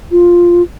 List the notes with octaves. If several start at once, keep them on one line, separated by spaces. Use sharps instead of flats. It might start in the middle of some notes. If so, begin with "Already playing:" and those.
F4